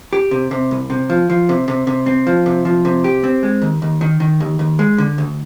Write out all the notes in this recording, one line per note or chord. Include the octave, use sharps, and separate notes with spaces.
G4
C3
C3
C2
C3
F3
F3
C3
C3
C3
C4
F3
C3
F3
C3
G4
C4
G#3
D#2
D#2
D#3
D#3
D#2
D#2
G#3
D3
D2